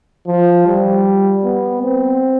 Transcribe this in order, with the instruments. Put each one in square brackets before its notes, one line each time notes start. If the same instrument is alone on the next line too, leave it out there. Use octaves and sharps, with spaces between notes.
[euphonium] F3
G3
B3
C4